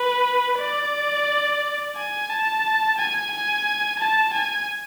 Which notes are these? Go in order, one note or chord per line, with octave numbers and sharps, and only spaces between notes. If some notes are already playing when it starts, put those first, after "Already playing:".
Already playing: B4
D5
G#5
A5
G#5
G#5
A5
G#5